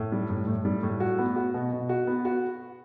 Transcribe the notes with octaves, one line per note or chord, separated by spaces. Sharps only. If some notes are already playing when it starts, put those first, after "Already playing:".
Already playing: A2
G3
A2
A2
G3
A2
F#4
B3
F#4
B2
B2
F#4
B3
F#4